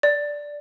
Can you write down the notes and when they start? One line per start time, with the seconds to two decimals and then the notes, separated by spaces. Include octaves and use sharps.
0.03 D5